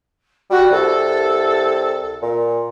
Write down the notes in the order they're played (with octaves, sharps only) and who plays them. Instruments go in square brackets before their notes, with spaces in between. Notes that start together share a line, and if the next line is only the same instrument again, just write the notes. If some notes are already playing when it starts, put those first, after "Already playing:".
[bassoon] G3 [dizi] F#4
[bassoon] C2 [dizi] A4
[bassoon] A#2